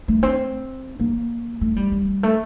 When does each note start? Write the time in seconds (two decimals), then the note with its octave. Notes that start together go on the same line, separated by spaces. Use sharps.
0.08 A3
0.23 C4
1.00 A#3
1.61 A3
1.76 G3
1.92 G3
2.23 A3